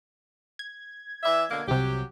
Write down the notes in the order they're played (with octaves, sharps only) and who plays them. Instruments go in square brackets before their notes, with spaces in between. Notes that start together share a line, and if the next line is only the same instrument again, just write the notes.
[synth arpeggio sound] G#6
[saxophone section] E3 D5 E5
B2 D3 A#3
[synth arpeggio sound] C2 C3 [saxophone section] F#3 G4